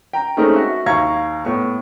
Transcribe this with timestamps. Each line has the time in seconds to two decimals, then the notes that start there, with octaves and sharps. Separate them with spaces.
0.13 G5 A#5
0.37 G#3 A3 C4 C#4 D#4 A#4
0.56 F#4 E5
0.86 D#2 F5 A#5 C#6 G#6
1.45 A2 B3 C#6